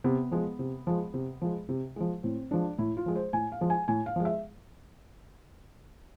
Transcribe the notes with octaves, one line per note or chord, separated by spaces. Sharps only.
C3 B3
F3 G#3
C3
F3 G#3
C3
F3 G#3
C3
F3 G#3
A2 C4
F3 G#3 D4
A2 E4
F4
F3 G#3
C5
A2 G#5
F5
F3 G#3
G#5
A2 G#5
F5
F3 G#3
E5